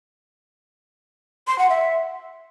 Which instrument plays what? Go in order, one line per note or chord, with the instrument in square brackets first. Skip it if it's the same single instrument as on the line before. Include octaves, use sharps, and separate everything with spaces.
[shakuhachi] C6
F#5
E5